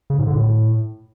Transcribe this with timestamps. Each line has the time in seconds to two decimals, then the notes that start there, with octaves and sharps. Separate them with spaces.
0.10 C#3
0.18 G#2
0.27 D3
0.35 A2